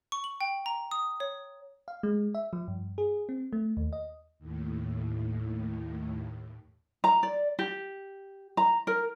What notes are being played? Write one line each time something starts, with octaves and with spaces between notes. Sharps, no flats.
C#6
F#7
G5
A#5
D#6
C#5
F5
G#3
E5
F3
G2
G#4
C4
A3
D#2
D#5
D#2 A2
A#5
D5
G4
A#5
A#4